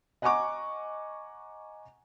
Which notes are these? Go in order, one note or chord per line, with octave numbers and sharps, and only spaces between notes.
D#5 F#5 G#5 A#5 C#6 D6